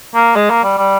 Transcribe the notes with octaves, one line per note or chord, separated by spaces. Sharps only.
A#3
G#3
A#3
G3
G3